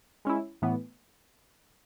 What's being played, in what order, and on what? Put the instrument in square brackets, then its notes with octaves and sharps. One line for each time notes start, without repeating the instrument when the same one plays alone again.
[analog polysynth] G#3 C#4 E4
A2 E3 B3